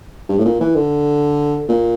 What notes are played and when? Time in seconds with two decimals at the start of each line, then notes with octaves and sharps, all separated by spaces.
0.29 G2
0.38 A2
0.45 A#2
0.61 E3
0.75 D3
1.69 A#2